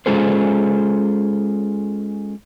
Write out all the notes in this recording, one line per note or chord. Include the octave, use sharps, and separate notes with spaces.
G#3 C#4 F4 G#4 A4 C5